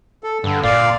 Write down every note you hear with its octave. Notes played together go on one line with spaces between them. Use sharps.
A4
G2 D3
G1 A#2 D5 F5